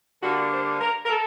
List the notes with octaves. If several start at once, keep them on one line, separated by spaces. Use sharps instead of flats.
D3 G3 A#3 D4 F#4
C5
A#4
A#4
A4